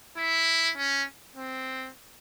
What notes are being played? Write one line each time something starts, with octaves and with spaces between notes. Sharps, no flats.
E4
C#4
C4